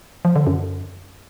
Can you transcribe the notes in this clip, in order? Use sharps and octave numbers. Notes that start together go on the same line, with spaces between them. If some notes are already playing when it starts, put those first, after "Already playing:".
F3
D3
F#2